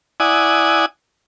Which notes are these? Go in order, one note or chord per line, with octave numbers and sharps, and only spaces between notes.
E4 D5 F#5 G#5 D#6